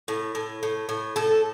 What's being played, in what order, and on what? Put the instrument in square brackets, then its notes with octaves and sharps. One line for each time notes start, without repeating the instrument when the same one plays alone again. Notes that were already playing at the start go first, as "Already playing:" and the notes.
[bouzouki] A2
A2
A2
A2
A2 A4